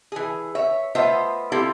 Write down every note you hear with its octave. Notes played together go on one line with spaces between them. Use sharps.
E3 G#4
C#5 E5
A3 B3 F4 C5 D#5 E5
C4 E4 F4 G4 A4